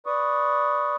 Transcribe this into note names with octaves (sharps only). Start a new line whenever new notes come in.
B4 D5 C#6 D#6